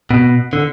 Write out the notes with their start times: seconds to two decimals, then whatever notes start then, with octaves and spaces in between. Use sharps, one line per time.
0.11 B2
0.53 D3